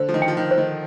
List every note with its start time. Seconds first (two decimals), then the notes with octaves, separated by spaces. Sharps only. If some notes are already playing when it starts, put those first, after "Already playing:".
Already playing: D3 C5
0.09 F3
0.14 D#3
0.22 G5
0.28 F3
0.37 D#3
0.51 C5
0.58 D#3